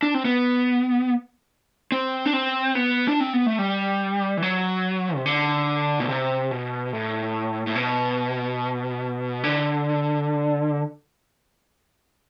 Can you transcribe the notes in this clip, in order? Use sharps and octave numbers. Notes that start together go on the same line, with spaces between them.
D4
C4
B3
C4
D4
C4
B3
D4
C4
B3
A3
G3
E3
F#3
C3
D3
B2
C3
B2
A2
A2
B2
D3